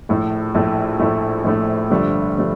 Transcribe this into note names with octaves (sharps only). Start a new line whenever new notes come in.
A#1 A2 A3
A#1 A2 A3
A#1 A2 A3
A#1 A2 A3
G2 D3 F3 A3 D4
D3 F3 A3 D4